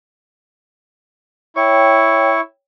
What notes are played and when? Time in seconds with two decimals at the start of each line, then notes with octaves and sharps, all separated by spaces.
1.56 E4 C#5 G5 C#6